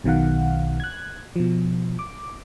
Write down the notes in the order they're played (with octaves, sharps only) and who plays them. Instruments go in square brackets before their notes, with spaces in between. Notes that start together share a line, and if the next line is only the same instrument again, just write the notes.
[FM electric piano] B1 B2 D#3 F5 F#5
F#6 G#6
B2 F3
D6